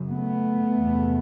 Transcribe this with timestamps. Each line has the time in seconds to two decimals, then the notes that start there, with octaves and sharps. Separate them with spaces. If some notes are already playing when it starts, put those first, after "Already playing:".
Already playing: F#2 C#3
0.10 A3 B3
0.79 E2 C3